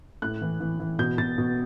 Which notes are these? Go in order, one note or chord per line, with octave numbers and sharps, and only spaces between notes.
A2 F#6
E3
E3
E3
B2 G6
B2 A6
B2